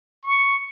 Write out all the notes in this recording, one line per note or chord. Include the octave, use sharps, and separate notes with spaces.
C#6